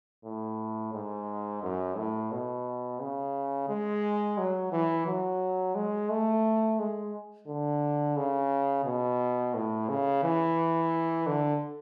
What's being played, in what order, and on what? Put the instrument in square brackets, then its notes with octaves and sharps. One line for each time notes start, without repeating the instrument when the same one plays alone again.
[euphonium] A2
G#2
F#2
A2
B2
C#3
G#3
F#3
E3
F#3
G#3
A3
G#3
D3
C#3
B2
A2
C#3
E3
D3